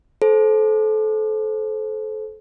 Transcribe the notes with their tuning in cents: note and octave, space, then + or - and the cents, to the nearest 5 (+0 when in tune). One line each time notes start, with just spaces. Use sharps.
A4 -25 C5 +0